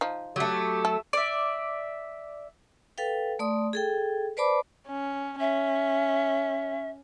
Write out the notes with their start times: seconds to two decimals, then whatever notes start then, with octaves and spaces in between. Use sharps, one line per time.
0.01 F3 D#4
0.36 F#3 A3 G4
0.85 A4 E5
1.13 D5 E5
2.98 A4 B4 F5 G5
3.39 A3 D5 C6 D#6
3.73 G#4 A4 G5
4.37 B4 C5 D5 A5 B5 D6
4.88 C#4
5.40 C#4 E5